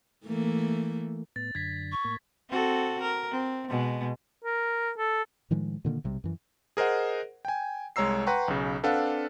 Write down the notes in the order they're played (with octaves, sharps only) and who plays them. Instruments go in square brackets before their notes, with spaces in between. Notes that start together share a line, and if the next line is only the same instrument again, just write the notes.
[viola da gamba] E3 A3 A#3
[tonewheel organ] A2 B3 [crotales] A6
[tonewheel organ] F#2 D3 [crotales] G#6 B6
[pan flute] C#6
[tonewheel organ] A2 A#3
[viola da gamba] C4 F#4 A4
A#4
C4
B2 G#3
[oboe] A#4
A4
[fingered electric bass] A2 D#3 F3 G#3
A#2 D3 D#3 A#3
B1 C3 G3
F#2 E3
[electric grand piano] G#4 A#4 C5 D#5 F#5
G5 G#5
C2 G#3 C#5 A#5 E6 C7
B4 F#5 G5 A#5 C6 C#6
B1 C#3
C4 D4 A4 B4 F5 F#5